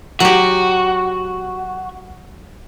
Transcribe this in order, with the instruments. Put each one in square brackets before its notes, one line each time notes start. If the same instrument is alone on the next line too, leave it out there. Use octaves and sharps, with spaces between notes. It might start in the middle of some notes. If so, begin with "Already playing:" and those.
[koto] F#3 G4 [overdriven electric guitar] F#4